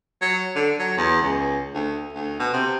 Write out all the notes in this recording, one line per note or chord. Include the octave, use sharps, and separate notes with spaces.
F#3
D3
F#3
E2
C#2
D2
D2
B2
C3